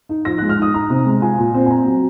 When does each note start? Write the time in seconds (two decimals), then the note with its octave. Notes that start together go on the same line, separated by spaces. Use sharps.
0.09 D#4
0.25 F3 A#6
0.38 G#3 F#6
0.49 F6
0.58 D#4 D#6
0.74 D#4 A#5
0.90 C3
1.05 G#3
1.22 F4 G#5
1.39 A#2
1.54 C4
1.66 G#5
1.70 C4 A#5
1.86 F#3